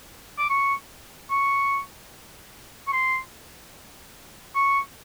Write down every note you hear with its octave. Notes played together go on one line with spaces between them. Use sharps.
D6
C#6
C#6
C#6
C6
C#6